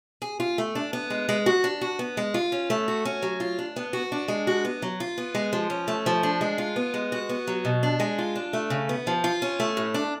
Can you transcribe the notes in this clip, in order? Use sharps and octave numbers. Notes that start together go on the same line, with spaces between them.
G#4
F4
A3
D4
B3
G#3
G#3
F#4
D4
F#4
B3
G#3
F4
C#4
A3
F#4
C#4
F#3
F4
D4
B3
F#4
D4
G#3
F#4
B3
F#3
F4
B3
G#3
F3
C#4
A3
F3
D4
G#3
F4
B3
G#3
F#4
B3
F#3
B2
D4
G#3
F4
D4
A3
C#3
B3
F3
F4
C#4
A3
A2
D4